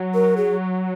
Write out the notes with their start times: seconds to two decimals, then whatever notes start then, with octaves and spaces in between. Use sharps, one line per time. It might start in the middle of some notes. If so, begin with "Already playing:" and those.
Already playing: F#3
0.14 A#4
0.37 G#4